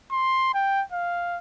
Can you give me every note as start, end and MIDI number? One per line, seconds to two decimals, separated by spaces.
0.11 0.51 84
0.54 0.83 79
0.92 1.39 77